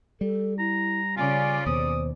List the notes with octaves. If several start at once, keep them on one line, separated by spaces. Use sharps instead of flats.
G3 A4
E4 A#5
C#3 C#4 F4 D5 G#5
D#2 B2 C5 D#6